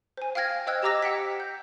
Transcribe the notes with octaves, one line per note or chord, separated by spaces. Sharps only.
C5 G#5
F5 G5 F6 G#6 A#6
C5 D#5 G5 E6 F#6 G#6
G4 D#5 A#5 D6 E6 A#6
F#5 G5 B6
G6